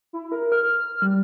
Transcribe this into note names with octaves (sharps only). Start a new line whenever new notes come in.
E4
A#4
F6
G3